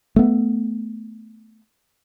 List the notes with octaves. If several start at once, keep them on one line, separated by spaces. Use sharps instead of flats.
A3 B3